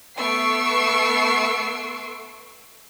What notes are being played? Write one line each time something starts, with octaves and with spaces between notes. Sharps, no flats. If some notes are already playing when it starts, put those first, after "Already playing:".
A3 B3 C#6 E6 C7 D7